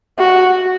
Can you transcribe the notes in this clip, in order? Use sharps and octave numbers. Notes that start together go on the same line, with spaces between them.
F#4